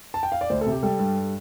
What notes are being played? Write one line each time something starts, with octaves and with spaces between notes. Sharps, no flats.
A5
G5
F5
D5
D2 C5
A4
C3
G4
G3 A4
G2